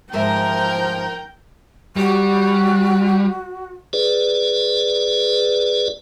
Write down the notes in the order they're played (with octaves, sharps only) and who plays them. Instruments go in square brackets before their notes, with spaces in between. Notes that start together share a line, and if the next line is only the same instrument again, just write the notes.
[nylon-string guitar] G#2 C5 E5 [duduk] F3 [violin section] A#4 [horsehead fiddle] G5
[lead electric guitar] G3 [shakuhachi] F#4
[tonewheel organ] G#4 B4 D5